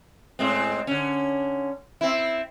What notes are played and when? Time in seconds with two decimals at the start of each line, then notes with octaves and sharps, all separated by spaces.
0.39 A2 G#3 C4
0.87 D3 C#4
2.01 C4 E4